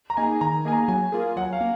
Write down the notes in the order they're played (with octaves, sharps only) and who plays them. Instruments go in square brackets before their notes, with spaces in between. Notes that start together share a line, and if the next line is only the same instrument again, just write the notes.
[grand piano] A#5
[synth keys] A#3 D#4 G#4 [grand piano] G#5
[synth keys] D#3 [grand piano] A#5
[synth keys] A#3 D#4 G#4 [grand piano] G#5
[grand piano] A#5
[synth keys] F#3 [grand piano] G#5
[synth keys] A#3 F4 G#4
[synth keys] F#3 [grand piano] F#5
[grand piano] F5
[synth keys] A#3